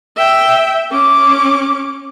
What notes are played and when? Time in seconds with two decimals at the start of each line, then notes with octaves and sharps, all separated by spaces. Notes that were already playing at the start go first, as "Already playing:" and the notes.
0.17 E5 G5
0.92 C#4 D6